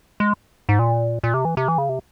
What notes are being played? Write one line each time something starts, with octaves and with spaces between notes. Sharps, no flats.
G#3
G#2
A#2
A#2
C3
E3
C3
E3
C#3
C3